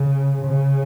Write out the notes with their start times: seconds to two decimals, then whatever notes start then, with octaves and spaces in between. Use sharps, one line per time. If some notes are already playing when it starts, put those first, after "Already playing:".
Already playing: C#3
0.45 C#3